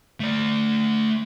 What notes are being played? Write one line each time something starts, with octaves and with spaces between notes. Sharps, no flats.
A3 D5